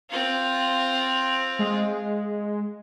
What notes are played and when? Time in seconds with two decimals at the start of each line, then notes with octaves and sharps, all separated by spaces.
0.10 C4 F4
1.59 G#3